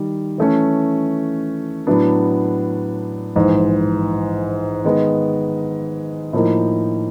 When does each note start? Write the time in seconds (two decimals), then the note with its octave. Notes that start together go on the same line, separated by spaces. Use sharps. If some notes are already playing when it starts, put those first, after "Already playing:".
Already playing: D#3 G3
0.38 E3 A3 C#4
1.87 A2 F#3 B3 D4
3.36 A#1 G#2 E3
4.84 D#3 G#3 B3
6.33 A2 F3 A#3 D#4